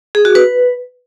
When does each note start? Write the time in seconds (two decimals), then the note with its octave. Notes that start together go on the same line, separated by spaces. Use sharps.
0.15 G#4
0.25 F#4
0.35 B4